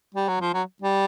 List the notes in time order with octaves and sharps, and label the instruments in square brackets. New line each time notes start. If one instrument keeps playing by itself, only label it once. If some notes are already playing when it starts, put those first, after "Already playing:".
[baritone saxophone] G3
F#3
F3
F#3
G3